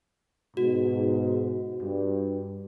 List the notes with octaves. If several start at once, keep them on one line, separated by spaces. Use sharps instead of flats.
G#2 B2 F#4
G2